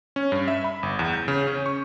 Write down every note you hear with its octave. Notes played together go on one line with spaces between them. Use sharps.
C#4
G2
E5
B5
G1
E2
G6
C#3
C#4
C#6